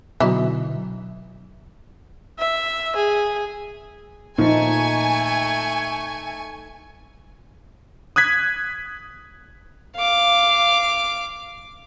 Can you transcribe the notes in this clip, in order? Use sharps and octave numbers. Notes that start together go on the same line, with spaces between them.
B2 D3 E3 F#3 D#4 E4
E5
G#4
A#2 F3 A3 D#4 G#5 C#6
D#6 F#6 G#6 B6
F5 D6